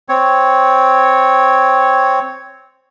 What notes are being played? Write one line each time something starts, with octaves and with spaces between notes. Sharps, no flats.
C4 C#5